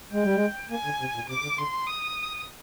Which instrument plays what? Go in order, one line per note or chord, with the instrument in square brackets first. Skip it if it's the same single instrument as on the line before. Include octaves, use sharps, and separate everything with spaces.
[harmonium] G#3 [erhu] G5
[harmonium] G3
G#3
[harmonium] A#3 [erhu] G#5
[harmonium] D3
C3
A#2
[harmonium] C3 [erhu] D6
[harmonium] D3
[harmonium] D3 [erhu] C6
[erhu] D#6